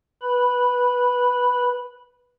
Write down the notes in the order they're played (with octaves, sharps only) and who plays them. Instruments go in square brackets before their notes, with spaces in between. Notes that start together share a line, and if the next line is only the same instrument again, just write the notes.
[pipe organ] B4 B5